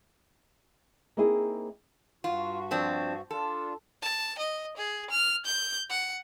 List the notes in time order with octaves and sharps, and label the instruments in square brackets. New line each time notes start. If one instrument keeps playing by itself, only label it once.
[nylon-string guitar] A#3 C4 D#4 E4 G#4
[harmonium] G2 F#4 [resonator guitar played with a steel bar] F4
[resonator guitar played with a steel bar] F3 C4 D4
[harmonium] D4 F4 [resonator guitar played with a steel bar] A4
[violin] A5
D#5
G#4
F6
G6
F#5